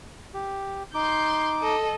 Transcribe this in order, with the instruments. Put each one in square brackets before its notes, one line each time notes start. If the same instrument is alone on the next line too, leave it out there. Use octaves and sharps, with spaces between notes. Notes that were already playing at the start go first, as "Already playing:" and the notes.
[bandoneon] G4
[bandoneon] D#4 D6 [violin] C6 G6
[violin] A4 D#5